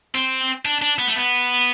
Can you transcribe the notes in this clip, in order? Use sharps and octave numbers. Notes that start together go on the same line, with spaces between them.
C4
D4
D4
B3
A3
B3